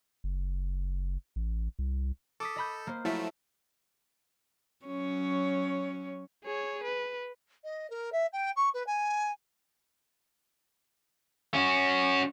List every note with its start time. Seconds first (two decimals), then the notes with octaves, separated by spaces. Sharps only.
0.24 F#1
1.36 A1
1.79 C2
2.40 A4 D6 D#6 B6
2.56 D#5 B5 G6
2.87 A#3 C5
3.05 F3 F#3 A3 E4 A4 E5
4.86 F#3 C#4 C#5
6.44 G#4 C#5
6.84 B4
7.64 D#5
7.89 A#4
8.12 E5
8.32 G5
8.56 C#6
8.73 B4
8.86 G#5
11.54 C#4 F#4